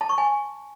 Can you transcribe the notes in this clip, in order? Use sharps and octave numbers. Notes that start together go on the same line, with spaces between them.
A5
C#6
G#5